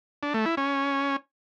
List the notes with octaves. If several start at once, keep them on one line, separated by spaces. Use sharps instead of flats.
D4
A3
E4
C#4